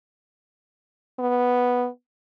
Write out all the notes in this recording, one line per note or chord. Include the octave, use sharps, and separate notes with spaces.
B3